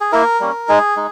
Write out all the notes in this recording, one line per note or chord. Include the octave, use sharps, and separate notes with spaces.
G#4
A#3 E4 A#4
G3 A#3 C#4
G#3 D#4 G#4
G#3 D#4